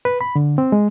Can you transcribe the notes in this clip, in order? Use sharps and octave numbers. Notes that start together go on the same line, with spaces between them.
B4
B5
D3
C4
G#3